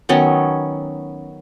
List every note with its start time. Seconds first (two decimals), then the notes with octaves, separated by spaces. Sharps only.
0.09 D#3 F#3 B3 C#4